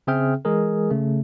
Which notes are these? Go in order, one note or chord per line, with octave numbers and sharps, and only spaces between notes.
C#3 C4 G#4 E5 G5 F6
E3 G#3 G#4 A#4
C#3 A3